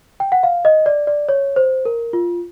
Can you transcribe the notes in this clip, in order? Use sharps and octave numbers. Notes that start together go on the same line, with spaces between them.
G5
F#5
F5
D#5
D5
D5
C#5
C5
A#4
F4